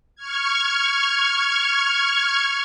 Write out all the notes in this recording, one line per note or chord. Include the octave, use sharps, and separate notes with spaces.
C#6 F6 G#6